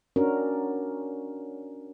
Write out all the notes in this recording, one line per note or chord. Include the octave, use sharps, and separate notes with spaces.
C#4 D4 F#4 A#4